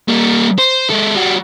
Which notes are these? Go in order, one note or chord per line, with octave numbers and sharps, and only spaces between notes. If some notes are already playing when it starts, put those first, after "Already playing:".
G3 A#3
C5
G#3 A4
G3 F#4